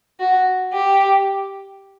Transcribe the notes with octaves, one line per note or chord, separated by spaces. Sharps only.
F#4
G4